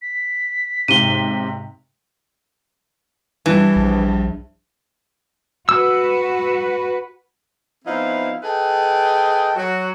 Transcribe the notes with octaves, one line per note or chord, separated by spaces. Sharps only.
B6
B1 G#2 C3 D#7 G7
G2 E3 G3
A#1
F#4 B4 E6
F3 B3 C4 D#4 E4 F5
G#4 A4 B4 D#5 G5
F#3 F#4